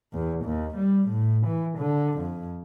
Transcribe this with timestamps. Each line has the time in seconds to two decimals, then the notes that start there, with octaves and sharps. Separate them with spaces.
0.13 E2
0.45 D#2
0.76 G3
1.09 A2
1.46 E3
1.78 D3
2.18 F2